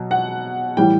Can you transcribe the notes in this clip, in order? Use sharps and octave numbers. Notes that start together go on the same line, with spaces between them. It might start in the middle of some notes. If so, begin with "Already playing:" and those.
Already playing: B2 F#3
F#5
A2 E3 G3 G5